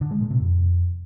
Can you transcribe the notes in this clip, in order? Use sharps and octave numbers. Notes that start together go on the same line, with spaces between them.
D3
G#3
A#2
C3
F2